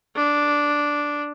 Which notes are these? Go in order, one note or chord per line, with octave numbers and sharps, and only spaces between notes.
D4